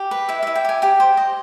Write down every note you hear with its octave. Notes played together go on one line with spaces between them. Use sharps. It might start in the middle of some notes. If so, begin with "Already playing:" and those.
Already playing: G4
B4
E4 E5
E5
E4
G5
G4 G#5
G4 G5
C5
D#5